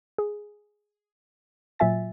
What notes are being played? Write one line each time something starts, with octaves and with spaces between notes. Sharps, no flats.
G#4
A#2 F#3 F4 E5 G#5 A6